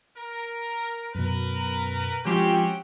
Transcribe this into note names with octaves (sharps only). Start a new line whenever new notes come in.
A#4
F#2 B2 A#4 B4
F3 G#3 C4 C#4 F#4 G4 G5